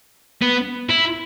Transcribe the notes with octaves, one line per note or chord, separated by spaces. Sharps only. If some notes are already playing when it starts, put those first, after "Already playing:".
B3
E4